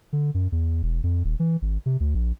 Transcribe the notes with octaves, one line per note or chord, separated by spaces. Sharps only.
D3
F#2
E2
E1
F2
D#1
E3
G#1
C3
D2
A#1